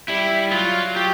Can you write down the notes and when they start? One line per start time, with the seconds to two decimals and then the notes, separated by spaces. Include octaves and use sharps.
0.08 G3 E4
0.52 F#3 F4
0.96 G4